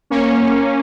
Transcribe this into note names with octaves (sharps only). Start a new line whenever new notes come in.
A#3 C#4